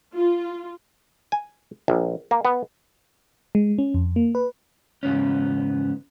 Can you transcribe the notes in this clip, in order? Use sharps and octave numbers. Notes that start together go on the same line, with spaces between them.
F4
G#5
A#1
A#3
B3
G#3
C#4
F2
A#3
B4
E2 G#2 C#3 B3 C#4